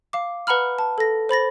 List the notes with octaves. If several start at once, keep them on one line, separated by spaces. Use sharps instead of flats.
F5 D6
B4 F#5 A#5 B5 F6
A5
A4 A#6
C5 B5 A6 A#6